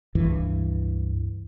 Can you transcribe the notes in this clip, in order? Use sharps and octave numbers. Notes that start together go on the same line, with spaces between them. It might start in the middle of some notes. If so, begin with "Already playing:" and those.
C#2 G2 E3